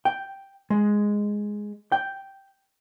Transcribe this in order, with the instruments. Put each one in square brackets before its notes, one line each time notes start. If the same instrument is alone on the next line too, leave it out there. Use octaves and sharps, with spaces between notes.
[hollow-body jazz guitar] G5
G#3
G5